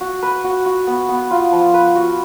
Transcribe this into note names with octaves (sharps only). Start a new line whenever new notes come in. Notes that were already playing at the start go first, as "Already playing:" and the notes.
F#4
B4
F#4
F#4
B3
B3
F4
F3
B4
F#4